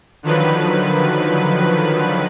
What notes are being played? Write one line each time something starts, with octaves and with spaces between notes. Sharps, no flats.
D3 D#3 F3 F#3 B4